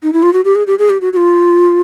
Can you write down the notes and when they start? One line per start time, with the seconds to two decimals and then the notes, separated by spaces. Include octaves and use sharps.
0.03 D#4
0.13 E4
0.23 F4
0.33 F#4
0.45 G4
0.55 G#4
0.67 G4
0.79 G#4
0.90 G4
1.01 F#4
1.13 F#4
1.17 F4